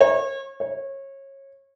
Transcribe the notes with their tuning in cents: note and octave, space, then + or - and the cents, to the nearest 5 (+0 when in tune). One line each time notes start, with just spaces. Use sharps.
C#5 -35
C#5 -25